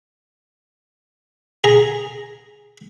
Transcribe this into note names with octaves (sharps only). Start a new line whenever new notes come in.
G#4 A#5